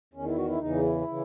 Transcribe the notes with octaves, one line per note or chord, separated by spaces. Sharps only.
E2 D#3 C#4
E4
F#4
E4
E2 C#3 E3 D#4
E4
C#3 E3